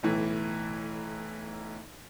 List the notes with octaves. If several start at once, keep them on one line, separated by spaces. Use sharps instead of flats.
B1 A2 E3